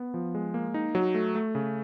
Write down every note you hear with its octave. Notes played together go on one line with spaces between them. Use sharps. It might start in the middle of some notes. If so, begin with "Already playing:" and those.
Already playing: B3
F3
G#3
A#3
D#4
F#3
A3
A3
C#3